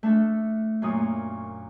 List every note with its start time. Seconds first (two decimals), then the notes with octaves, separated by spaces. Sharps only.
0.03 A3 D4 A4
0.82 F#2 A#2 C#5 D#6